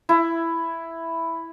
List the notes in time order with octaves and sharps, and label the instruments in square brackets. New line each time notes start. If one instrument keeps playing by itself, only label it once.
[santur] E4